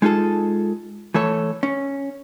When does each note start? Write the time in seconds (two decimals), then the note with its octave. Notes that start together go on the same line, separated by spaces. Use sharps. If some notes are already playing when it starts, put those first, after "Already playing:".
0.02 G#3 D#4 F4 G#4 A4
1.14 E3 A3 A4 C#5
1.63 C#4